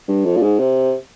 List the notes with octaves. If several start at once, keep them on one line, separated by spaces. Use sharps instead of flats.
G2
F2
A#2
G#2
C3